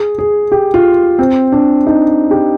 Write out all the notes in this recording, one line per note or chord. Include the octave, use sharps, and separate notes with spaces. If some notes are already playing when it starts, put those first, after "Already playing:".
Already playing: G#4
G#4
G4
F4
C4
D4
D#4
G4